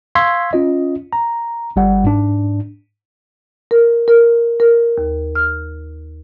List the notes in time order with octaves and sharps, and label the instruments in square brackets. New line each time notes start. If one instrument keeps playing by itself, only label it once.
[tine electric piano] F5 C6 C#6 E6 G#6 B6
C#4 F4 D#5
A#5
G1 G3 F#5
G#2 D4
[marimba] A#4
A#4
A#4
D#2
F6